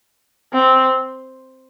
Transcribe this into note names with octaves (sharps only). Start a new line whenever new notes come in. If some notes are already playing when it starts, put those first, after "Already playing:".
C4